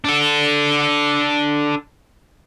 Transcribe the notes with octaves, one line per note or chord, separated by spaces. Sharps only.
D4 A4